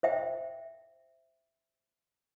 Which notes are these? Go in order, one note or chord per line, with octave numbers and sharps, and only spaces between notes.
C5 E5 G5